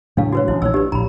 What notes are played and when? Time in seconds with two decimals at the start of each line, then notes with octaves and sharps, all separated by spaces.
0.17 A2 C#3 F#3 D4 F5
0.33 F#4 B4 C#5
0.48 A1 E4
0.62 A#1 D#4 C#5 E6
0.74 D4 G4 B4
0.92 A#1 A2 A#5 B5